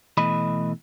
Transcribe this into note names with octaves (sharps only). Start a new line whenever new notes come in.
B2 E3 A3 D#5 B5